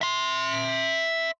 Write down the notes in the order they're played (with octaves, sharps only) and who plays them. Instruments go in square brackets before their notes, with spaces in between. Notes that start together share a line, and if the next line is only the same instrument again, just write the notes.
[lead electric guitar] E5 C6